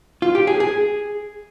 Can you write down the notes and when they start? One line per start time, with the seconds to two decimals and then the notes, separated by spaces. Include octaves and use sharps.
0.22 F4
0.35 G4
0.47 G#4
0.60 G#4